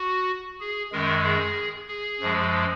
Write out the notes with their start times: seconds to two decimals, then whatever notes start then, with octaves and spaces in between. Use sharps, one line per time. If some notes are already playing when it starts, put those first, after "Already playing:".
Already playing: F#4
0.61 G#4
0.92 F#2 D#3 G#3 A#4
1.24 G#4
1.88 G#4
2.20 F#2 F3 G#3